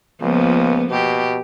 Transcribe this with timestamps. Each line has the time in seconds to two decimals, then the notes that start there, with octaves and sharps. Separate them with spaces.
0.21 C#2 F3 A#3 B3
0.90 B2 G4